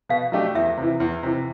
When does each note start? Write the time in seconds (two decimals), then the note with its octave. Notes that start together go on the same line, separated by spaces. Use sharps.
0.09 B2 F5
0.32 F#3 A3 D4 G4
0.55 E2 E5
0.77 C3
0.83 E3
1.00 E2
1.23 C3 E3